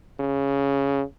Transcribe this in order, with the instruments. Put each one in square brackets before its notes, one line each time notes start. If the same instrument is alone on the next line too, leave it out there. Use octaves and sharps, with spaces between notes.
[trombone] C#3